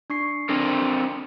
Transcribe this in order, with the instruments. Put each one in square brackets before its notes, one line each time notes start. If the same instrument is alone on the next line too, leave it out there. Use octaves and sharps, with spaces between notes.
[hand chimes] D4 C#6 C7
[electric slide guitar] C4 A4 A#4 [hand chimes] D4